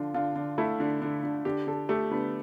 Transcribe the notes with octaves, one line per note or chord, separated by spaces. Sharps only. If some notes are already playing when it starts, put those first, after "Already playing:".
Already playing: D3 F3 F4
D3 F4
D3
A3 E4
D3
D3
D3
D3 G4
D3 A4
A3 G4
D3 B3